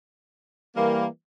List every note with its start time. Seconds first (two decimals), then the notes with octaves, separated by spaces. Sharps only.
0.75 E3 G3 A#3